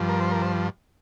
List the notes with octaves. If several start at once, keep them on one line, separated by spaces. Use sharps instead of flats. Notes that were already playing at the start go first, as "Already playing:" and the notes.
Already playing: G2 F3
A#4
C5
A#4
C5